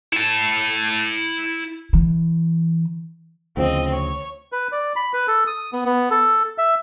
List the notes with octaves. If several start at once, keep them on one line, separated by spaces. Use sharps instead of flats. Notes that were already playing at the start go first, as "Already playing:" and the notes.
E4 A5
E3
D2 C#3 F3 C4 D#5
C#5
B4
D5
B5
B4
A4
D#6
B3
B3
A4
E5